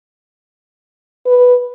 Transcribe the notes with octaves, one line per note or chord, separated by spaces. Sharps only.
B4